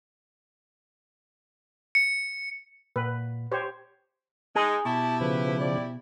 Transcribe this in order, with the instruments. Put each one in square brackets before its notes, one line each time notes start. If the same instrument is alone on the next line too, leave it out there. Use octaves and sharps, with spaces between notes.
[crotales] C#7
[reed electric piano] A#2 [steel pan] B4
[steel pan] G4 C5 C#5
[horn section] G#3 D#4 [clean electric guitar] G#4
[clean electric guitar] B2 [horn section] E4 G4 [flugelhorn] A5
[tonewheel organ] C#3 F3 [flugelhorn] B4
[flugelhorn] D5